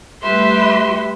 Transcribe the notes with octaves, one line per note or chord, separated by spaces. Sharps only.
G3 A3 G4 B4 E5 C6